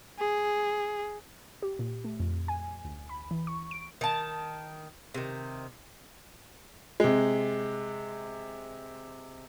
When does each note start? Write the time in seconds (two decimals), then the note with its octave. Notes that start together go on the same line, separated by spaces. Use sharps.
0.19 G#4
1.62 G4
1.79 A#2
2.04 A3
2.20 F2
2.48 G#5
2.85 D2
3.09 B5
3.31 E3
3.47 C#6
3.71 D7
4.01 D#3 A5
5.14 C3 D#3
7.00 C3 G#3